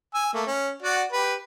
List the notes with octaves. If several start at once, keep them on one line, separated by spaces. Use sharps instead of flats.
G#5 E6
A3 A#3
C#4
F#4 D5 F#5
G4 B4